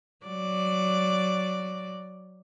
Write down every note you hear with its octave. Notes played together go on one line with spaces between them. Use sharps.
F#3 D5